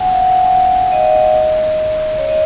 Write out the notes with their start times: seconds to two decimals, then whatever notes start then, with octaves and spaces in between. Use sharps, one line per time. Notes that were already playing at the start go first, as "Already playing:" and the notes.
Already playing: F#5 G#5
0.11 F5
0.21 F#5
0.43 G#5
0.49 F#5
0.92 D#5
2.18 C#5
2.28 D#5